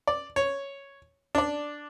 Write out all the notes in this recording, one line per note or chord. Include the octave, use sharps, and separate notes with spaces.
D5
C#5
D4 D5